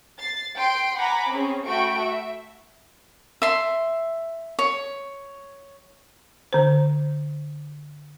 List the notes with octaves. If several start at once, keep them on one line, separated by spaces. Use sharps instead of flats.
A6 C7
G5 C6 D7
F#5 G#5 A#5 B5 D6
C4 C#4 G#4
A3 F#4 G5 B5 C#6 D7
E5
E5 C6
C#5
D3 C5